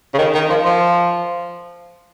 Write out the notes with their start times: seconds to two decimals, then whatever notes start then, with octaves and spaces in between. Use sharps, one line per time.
0.14 C#3
0.19 D#3
0.34 D#3
0.49 F3
0.65 F3